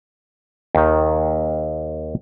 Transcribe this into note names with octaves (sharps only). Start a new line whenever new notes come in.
D#2 D#3